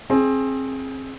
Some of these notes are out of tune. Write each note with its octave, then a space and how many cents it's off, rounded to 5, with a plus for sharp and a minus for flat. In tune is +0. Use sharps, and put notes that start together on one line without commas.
C4 +25 G#4 +20